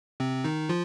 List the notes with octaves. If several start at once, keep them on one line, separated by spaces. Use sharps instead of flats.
C3 C4
D#3 D#4
F3 F4